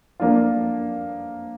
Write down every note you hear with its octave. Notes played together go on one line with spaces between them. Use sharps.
F3 A#3 D4 F4